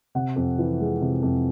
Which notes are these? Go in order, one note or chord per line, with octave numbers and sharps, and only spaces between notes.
C3 F#5
F2
E3
G#3
C3
F2